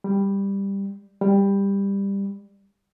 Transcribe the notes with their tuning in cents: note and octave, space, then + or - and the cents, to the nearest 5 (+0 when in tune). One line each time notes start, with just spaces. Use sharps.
G3 +10
G3 +15